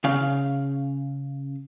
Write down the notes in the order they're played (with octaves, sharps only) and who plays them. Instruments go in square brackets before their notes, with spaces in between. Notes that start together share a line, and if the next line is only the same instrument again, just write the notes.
[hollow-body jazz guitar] C#3 F5